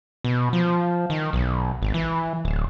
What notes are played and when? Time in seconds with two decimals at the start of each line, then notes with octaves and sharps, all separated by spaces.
0.24 B2
0.53 F3
1.10 D#3
1.33 B1
1.82 G#1
1.94 E3
2.45 D1